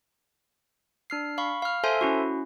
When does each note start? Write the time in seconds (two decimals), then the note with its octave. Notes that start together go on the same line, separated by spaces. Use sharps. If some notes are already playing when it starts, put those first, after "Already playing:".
1.10 D4 F6 C7
1.38 F5 B5 C#6
1.62 F5 F6
1.84 A4 C5 E5 G#5 C6
2.01 C#4 E4 F#4